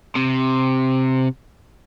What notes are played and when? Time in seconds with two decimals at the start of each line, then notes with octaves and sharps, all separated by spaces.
0.16 C3